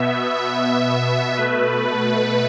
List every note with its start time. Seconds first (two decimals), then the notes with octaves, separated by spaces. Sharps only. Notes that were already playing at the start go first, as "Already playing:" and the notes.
Already playing: B2 B3 E5
0.35 E5
1.35 B2 A3 B4